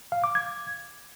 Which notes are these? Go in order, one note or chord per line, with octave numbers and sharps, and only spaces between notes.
F5
D6
G#6